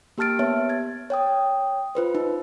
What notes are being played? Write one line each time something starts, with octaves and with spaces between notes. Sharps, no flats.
A#3 G4 A5 F6 A6 D7
B3 C#5 E5
G#6 A6
C#5 G5 D#6
F4 B4 C5
D#4